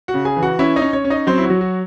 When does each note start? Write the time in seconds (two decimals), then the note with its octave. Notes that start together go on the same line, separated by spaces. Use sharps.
0.08 F#4 F#5
0.14 C#3
0.25 G#4 G#5
0.37 E3
0.43 F#4 F#5
0.59 C#4 E4 E5
0.76 D#4 D#5
0.82 C#4
0.93 C#4 C#5
1.05 C#4
1.10 D#4 D#5
1.27 F#3 C4 C5
1.38 E4
1.44 F#4
1.50 F#3
1.61 F#4